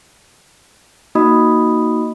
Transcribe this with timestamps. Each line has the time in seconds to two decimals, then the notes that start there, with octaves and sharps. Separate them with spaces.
1.15 A#3 D#4 F#4 D#5 B5 D#6